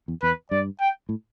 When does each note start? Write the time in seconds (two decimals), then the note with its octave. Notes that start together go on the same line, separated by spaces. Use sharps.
0.08 E2
0.22 E2 B4
0.51 G2 D5
0.80 G5
1.09 A2